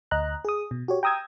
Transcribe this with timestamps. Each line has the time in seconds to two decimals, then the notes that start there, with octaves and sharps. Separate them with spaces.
0.11 D2 D#5 A#5 F#6
0.45 G#4 D#6
0.71 B2
0.88 F#4 G4 C#5
1.03 G5 A#5 D#6 E6 G#6